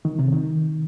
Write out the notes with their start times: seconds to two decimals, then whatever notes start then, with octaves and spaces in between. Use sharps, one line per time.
0.05 D#3
0.19 C3
0.32 D#3